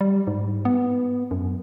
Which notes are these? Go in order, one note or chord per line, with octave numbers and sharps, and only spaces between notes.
G3
G#2
B3
F#2